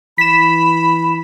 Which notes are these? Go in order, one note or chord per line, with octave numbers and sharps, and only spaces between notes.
E3 B5 B6 E7